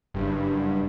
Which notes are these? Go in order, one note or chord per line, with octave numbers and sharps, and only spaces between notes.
F#1 G2